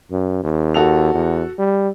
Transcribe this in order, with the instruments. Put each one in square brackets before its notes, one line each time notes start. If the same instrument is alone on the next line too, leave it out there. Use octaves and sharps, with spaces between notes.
[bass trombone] F#2
D#2
[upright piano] F#4 A4 F7
[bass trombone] E2
G3